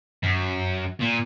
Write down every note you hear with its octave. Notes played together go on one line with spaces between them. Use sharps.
F#2
A#2